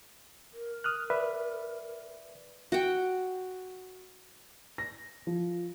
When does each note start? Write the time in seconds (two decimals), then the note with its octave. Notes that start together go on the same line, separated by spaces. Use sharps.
0.53 A#4
0.84 D#6 F6 F#6
1.10 B4 D5 E5
2.72 F#4 F#5 G5
4.78 A#6
5.27 F3